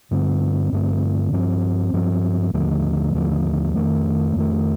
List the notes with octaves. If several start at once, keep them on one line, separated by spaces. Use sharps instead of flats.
G2 D3 A3 C4
G2 D3 A3 C4
G2 F3 C4
G2 F3 C4
D#2 D3 F3 A3
D#2 D3 F3 A3
F2 D#3 A3
F2 D#3 A3